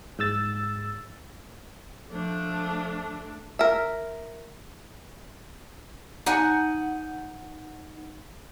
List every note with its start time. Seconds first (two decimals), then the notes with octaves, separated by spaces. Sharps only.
0.19 G#2 G#3 E6 A6
2.10 F3 A3 D4
3.59 A#4 E5
6.26 D#4 F#5 G#5